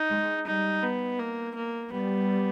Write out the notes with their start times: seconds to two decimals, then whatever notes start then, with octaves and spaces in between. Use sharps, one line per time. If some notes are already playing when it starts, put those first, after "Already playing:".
Already playing: D#4
0.10 G#3
0.47 G3 D#4
0.83 B3
1.19 A#3
1.55 A#3
1.93 G3 B3